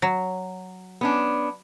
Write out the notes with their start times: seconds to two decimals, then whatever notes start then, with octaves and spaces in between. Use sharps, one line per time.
0.02 F#3
1.01 B3 C#4 D4